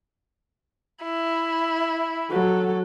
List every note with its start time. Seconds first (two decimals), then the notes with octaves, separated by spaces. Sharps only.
1.03 E4
2.30 F#3 A4